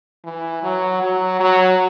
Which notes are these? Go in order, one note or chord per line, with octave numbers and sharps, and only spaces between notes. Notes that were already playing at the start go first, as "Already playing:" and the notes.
E3
F#3
F#3
F#3